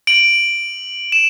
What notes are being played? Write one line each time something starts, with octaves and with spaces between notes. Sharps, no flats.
D7 F#7
E7